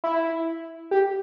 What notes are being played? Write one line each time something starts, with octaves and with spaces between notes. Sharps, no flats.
E4
G4